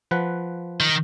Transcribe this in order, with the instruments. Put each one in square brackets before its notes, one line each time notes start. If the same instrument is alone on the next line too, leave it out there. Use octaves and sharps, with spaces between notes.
[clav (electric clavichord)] F3 B4 F#5
[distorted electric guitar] D#3